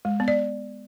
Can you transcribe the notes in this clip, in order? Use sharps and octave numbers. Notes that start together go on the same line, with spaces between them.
G#3
B3
D5